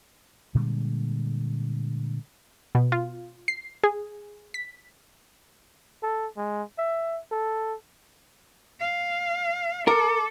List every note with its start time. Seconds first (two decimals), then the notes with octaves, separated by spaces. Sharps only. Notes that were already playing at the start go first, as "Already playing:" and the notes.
0.55 A#2 D3 G3 G#3
2.75 B2
2.92 F4
3.48 C7
3.84 G#4
4.54 B6
6.02 A4
6.37 G#3
6.78 E5
7.31 A4
8.80 F5
9.87 A4 A#4 D6